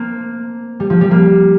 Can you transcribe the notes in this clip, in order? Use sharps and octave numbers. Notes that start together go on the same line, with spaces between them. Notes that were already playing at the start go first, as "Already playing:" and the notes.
Already playing: A#3 C4
G3
F3
G3
A#3